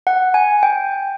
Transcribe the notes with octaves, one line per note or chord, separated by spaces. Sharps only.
F#5
G#5
G5